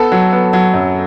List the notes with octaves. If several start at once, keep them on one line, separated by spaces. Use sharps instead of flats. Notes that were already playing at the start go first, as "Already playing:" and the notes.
Already playing: B3 A4
F#3
B3
F#3
F#2